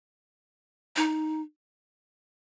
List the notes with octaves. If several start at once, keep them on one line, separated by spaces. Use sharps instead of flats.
D#4